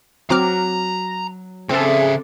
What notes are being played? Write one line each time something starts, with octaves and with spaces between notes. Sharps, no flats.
F#3 C4 A#5 D6 F6
C#3 C4 G#4 A4 C5 D5 E5